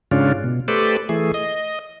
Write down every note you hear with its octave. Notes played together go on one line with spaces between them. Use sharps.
G#2 C#3 C#4 D4 F4
B2
A3 G4 A4 B4 C5 D5
E3 A3 G#4
D#5